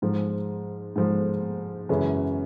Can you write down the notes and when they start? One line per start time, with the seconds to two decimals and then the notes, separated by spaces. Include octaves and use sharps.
0.02 G#2 F3 G#3
0.96 G#2 F3 G#3
1.89 F#2 C#3 E3 G#3 C#4